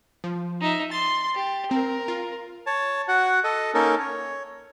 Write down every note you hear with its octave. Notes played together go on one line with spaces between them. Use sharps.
F3
D#4 E5
C6 A6
G4
C4 A#4
F4
C#5 A5
F#4 F#5
A4 D#5
A#3 C#4 D#4 A4 A#4
C#5